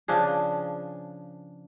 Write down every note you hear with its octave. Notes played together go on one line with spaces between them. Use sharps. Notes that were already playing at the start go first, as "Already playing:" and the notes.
C#3 F3 D4 G#4